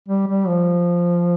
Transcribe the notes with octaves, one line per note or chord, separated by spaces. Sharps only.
G3
G3
F3